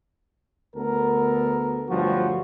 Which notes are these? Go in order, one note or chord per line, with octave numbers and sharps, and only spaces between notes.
D2 B3 A4 A#4
D2 G2 F3 F#3 F#4